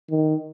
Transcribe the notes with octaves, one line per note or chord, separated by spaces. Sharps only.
D#3